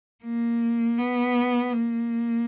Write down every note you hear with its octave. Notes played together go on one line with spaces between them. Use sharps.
A#3
B3
A#3